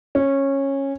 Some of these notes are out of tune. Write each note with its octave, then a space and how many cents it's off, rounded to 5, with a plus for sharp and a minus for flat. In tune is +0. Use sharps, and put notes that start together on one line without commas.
C#4 -15